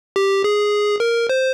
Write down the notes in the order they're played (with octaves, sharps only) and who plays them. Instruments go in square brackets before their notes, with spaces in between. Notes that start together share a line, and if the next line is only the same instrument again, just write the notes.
[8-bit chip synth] G4
G#4
A#4
C5